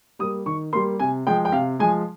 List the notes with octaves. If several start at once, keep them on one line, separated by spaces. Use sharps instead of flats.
G3 A#3 D#6
D#3 C#6
G3 A#3 C6
C3 G#5
F3 G#3 G5
G5
C3 F5
F3 G#3 G#5